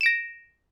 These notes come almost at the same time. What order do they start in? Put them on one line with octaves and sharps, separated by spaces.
E7 D7 A#6